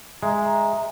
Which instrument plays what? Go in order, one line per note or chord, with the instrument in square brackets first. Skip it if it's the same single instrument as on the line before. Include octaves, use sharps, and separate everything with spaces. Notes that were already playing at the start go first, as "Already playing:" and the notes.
[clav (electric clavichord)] G#3 [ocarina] E5 [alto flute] A#5